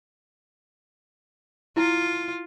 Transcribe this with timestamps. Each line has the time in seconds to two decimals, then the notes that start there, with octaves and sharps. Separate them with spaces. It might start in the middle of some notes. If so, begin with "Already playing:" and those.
1.77 E4 F4 A5